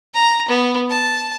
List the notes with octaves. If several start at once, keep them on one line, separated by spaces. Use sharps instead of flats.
A#5
B3
A5